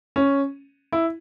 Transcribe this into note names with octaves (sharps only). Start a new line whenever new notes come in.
C#4
E4